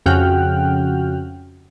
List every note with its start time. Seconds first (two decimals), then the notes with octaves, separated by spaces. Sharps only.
0.06 F2 C#3 F#4 G5 F6 F#6